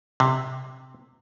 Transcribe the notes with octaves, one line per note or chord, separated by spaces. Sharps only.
C3